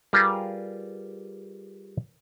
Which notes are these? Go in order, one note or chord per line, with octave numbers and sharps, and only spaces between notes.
G3 F4 G#4 A#4 B4